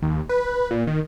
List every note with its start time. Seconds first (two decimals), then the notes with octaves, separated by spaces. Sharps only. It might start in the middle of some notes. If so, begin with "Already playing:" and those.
0.02 D#2
0.29 B4
0.71 A#2
0.87 D#3